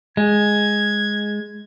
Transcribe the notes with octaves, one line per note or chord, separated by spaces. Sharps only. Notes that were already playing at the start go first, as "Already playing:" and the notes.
G#3 G#6